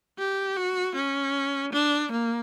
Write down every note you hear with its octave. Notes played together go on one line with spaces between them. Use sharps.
G4
F#4
C#4
D4
A#3